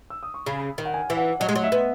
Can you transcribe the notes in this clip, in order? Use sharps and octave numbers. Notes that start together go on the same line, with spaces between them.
E6
D#6
C#6
C#3 B5
D#3
F#5
G#5
E3
F#5
F#3 D#5
G#3
F#3
E5
B3